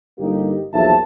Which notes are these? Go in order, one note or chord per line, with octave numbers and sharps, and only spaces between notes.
G1 G3 A#3 D#4 G4
B1 E2 F3 A#3 E5 A5